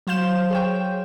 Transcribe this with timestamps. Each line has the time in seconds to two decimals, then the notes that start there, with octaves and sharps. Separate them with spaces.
0.07 F#3 C5 F5 G6 E7
0.50 G#4 C#5 G5